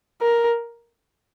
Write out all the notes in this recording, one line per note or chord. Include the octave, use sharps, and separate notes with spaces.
A#4